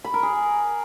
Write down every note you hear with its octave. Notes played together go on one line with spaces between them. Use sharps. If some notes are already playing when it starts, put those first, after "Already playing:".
B5
A#4
G#4